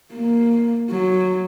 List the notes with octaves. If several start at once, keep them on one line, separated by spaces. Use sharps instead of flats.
A#3
F#3